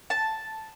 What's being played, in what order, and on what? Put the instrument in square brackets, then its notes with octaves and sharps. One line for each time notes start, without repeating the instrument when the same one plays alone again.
[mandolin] A5